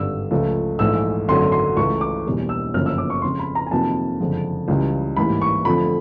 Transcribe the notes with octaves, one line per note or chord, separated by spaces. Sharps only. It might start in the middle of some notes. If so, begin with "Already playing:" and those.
Already playing: G#1 G2 D3 E6
C#2 C#3 F3 A3
A#1 G#2 E3 A3 E6
G#1 F#2 D3 F#3 A3 C6
C6
C#2 C#3 E3 A3 C#6
D6
E1 E2 B2 G3 A#3
E6
G1 F#2 C#3 F3 A#3 F6
E6
D6
C#6
F2 C#3 F3 G#3 C6
B5
A#5
G#5
F2 C3 D#3 F#3 A#3 A5
F#1 F2 D3 F3 G#3
C#2 C#3 E3 G3
A1 G#2 E3 G3 A#3 B5
C#6
F2 D3 F3 A3 B5